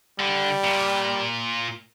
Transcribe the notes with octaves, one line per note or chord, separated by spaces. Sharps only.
D3 G3
A#2